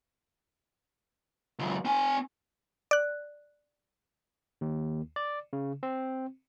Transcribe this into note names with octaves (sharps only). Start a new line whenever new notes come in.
C#2 F#2
C4 G#5
D5 F#6
D#2
D5
C#3
C4